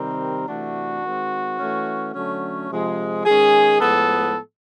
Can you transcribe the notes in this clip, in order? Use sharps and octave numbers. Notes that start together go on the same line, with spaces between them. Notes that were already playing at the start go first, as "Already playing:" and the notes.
Already playing: C3 D#3 G3 C4 A#4
C3 E3 A3 D4 F#4
D#3 G#3 C4
E3 A3 C#4
D3 F#3 A3 C#4
C3 F3 G#3
D#3 G#3 C#4 G#4
A2 F3 G#3 B3 A4